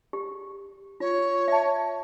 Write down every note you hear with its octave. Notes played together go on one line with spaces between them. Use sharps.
G4
F4 C#5
E5 A5